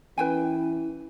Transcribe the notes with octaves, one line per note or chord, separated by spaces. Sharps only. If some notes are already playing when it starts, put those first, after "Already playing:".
E3 C#4 E4 B4 G5 G#5